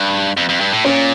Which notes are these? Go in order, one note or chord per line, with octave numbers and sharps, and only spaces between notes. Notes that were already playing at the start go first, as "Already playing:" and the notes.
Already playing: G2
F2
F2
G2
A2
A#2 C#4